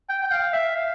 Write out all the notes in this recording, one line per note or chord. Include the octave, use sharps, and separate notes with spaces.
G5
G5
F5
E5
F5